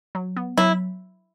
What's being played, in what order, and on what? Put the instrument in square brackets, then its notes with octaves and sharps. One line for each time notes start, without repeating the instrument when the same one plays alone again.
[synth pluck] F#3
B3
[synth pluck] F#3 [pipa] E4